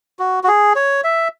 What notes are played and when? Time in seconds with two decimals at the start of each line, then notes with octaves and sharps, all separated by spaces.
0.19 F#4
0.44 F#4
0.48 G#4
0.76 C#5
1.04 E5